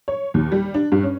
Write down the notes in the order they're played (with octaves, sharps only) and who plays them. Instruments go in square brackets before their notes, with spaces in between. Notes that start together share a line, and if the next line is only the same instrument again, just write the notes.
[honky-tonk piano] C#5
D#2
G3
D4
G2
C#4